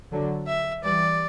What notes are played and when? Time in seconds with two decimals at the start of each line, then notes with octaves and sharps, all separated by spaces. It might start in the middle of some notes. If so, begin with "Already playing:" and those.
0.12 D3 F#3
0.47 E5
0.83 E3 G3 D5